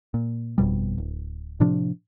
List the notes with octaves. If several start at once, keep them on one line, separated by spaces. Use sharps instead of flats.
A#2
G1 F2 B2 G3
D1
A2 C3 F3 D4